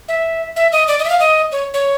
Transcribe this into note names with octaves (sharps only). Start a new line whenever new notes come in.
E5
E5
D#5
D5
D#5
E5
F5
D#5
C#5
C#5